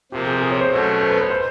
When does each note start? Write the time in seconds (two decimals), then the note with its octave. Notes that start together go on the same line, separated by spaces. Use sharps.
0.12 C3 F3 A#3 G4
0.27 G#4
0.41 G#4
0.51 C#5
0.61 C5
0.71 B2 F#3 A3 C#4
1.01 C5
1.10 B4
1.21 B4
1.30 C5